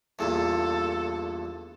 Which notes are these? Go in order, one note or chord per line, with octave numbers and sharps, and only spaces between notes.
E2 G2 A#2 A4